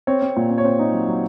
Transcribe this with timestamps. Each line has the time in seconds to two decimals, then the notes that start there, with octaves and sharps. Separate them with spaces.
0.07 C4 C#5
0.22 C4
0.37 A#2
0.50 C4
0.58 C#5
0.64 C4 C5
0.79 D#4
0.93 F#3
1.08 F#3